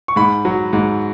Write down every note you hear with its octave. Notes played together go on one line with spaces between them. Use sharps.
C#6
G#2 B5
F#3
G#2